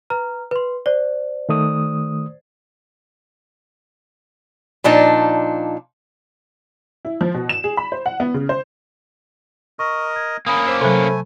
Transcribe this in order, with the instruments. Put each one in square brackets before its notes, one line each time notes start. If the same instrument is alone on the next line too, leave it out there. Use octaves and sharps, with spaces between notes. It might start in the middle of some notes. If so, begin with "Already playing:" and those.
[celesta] B4 A#5 F6
B4 C6
C5 D5
[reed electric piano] D#3 A3 D#6
[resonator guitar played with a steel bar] A#2 F3 D4 D#4
[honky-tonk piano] E4
F3
B2
E7
G#4
B5
C5
F#5
B3
C#3
C5
[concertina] A#4 D#5 [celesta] C#6
[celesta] G#6
[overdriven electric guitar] A#3 C#4 [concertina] G#5 [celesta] B5 D#6
[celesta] C5 D6 [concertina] F5 B5 E6
[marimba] C3 F#3 [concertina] A3 G#5 [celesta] A4 C5 B5